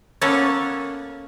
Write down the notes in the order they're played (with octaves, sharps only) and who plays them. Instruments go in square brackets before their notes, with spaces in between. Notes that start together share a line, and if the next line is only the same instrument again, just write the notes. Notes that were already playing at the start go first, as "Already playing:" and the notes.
[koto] A#3 B3 C#4 A4 C#5